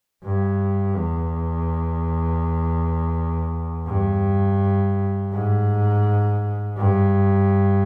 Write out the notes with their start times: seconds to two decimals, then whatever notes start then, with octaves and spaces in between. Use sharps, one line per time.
0.24 G2
0.97 E2
3.88 G2
5.33 G#2
6.78 G2